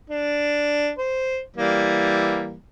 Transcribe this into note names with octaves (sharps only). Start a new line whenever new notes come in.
D4
C5
E3 G3 A#3